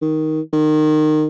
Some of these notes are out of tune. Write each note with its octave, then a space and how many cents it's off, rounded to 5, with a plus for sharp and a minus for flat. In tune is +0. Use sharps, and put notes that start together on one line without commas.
D#3 +10
D#3 -20